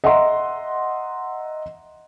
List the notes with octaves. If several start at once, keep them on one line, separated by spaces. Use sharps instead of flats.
D#5 E5 F#5 A#5 C6